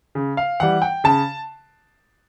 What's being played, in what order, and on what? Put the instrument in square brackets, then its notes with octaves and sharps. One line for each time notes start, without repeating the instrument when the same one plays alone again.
[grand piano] C#3
[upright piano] F5
[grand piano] E3 G3 [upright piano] F#5
[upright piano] G5
[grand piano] C#3 [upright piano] A5